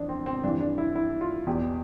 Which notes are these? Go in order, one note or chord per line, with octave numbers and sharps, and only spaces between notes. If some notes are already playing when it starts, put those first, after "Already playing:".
Already playing: F2 E3 D4
C4
C4
G2 E3 D4
D4
E4
E4
F4
E2 B2 G4